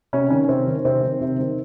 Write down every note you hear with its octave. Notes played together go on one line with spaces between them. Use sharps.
C3 C#4
D#3 C#4
C3 C4
D#3
C3 C4
D#3
C3
D#3